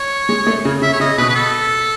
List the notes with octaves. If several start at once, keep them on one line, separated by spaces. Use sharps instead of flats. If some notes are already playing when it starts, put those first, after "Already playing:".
Already playing: C#5
G#3
A3
C#3
C#3 E5
C#5
C#3 D#5
B2 B4
B4
A4